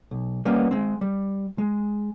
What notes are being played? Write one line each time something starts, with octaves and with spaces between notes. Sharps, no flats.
B1
G3 A#3 B3 C#4
G#3 C4
G3
G#3